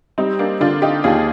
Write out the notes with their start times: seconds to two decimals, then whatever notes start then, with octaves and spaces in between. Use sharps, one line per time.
0.18 G3 C4 D#4
0.39 A#3 D4
0.60 D3 D4 F4
0.82 D#4 G4
1.04 D#2 F4 G#4